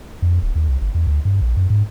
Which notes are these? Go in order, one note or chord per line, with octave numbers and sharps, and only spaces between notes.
F2
D1
D#2
C2
G1
E2
D2
G2
A#1
F#2
G#2